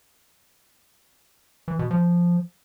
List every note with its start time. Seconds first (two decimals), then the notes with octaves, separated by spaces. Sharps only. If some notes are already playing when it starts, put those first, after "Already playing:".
1.68 E3
1.79 B2
1.91 F3